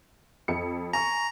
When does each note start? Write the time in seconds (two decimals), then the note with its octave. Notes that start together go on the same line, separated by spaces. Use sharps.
0.48 F2 C#7
0.93 G#5 A#5 C#6